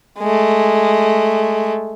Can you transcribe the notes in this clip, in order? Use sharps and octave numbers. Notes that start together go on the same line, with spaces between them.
G#3 A3